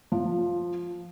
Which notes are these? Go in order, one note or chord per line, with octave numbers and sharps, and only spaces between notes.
F3